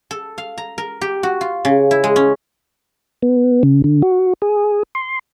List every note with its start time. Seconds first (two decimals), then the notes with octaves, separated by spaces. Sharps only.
0.11 A4
0.38 F5
0.58 A#5
0.78 A#4
1.01 G4
1.23 F#4
1.41 F4
1.65 C#3
1.91 E4
2.04 G#3
2.16 C#4
3.23 B3
3.63 C#3
3.84 D3
4.02 F#4
4.42 G#4
4.95 C6